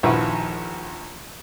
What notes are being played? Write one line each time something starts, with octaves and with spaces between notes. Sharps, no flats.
A#1 D#2 F3 E4 F#4 B4